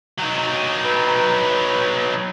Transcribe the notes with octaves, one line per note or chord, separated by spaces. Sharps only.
F#3 D#4
B4